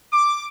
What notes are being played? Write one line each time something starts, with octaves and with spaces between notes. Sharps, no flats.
D6